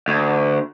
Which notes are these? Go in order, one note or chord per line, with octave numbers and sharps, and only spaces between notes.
D2